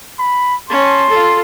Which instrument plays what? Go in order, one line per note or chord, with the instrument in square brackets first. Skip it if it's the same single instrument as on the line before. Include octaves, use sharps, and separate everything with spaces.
[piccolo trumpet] B5
[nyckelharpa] C#4 A5 [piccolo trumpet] C6
[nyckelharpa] F4 A4